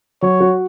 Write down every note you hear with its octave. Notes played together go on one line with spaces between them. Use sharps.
F#3 C#5
F#4